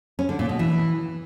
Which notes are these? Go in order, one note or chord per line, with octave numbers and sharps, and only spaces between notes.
C#4
D3
A#2
B2
E3